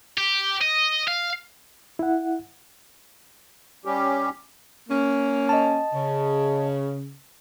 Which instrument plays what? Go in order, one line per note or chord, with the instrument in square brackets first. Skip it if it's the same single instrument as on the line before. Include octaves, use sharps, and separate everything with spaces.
[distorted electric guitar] G4
D#5
F5
[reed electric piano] E4 F#5
[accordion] G3 C#4 G4
[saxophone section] A#3 C#4
[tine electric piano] D#5 A5
[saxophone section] C#3